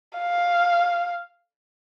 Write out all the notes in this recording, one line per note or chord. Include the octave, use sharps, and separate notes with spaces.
F5